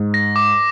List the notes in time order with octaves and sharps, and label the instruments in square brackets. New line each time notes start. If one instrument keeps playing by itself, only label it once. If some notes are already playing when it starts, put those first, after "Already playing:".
Already playing: [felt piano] G#2
[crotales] A#6
D6